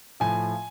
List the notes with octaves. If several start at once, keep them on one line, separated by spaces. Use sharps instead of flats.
A2 F3 G#5